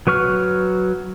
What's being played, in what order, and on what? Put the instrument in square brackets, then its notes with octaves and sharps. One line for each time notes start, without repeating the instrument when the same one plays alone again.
[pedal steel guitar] F#3 B4 C#6 F6